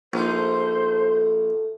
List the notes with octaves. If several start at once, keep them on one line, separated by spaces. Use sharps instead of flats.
A#1 A3 D#4 C5